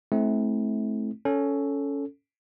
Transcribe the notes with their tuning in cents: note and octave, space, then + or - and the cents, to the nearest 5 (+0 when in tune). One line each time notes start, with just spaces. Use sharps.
A3 -30 C4 +0 E4 -20
C#4 +10 A4 +0